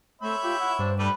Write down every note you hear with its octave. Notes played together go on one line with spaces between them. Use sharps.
A3 C4 C#5 E5 B5
F4 G4
E4 F#5
G2 D4 C5
G3 A3 B4 D5 B5